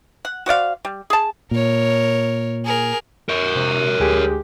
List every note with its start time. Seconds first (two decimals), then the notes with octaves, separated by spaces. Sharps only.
0.25 F#5
0.46 F#4 C5 D5 F5
0.85 G3
1.10 G#4 A5
1.51 A#2 A#4 C#5
2.65 G#4 A#4
3.29 A#4 C#5
3.56 C3
4.00 D2 G#3 G4